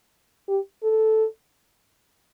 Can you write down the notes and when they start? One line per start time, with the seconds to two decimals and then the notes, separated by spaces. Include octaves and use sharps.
0.48 G4
0.83 A4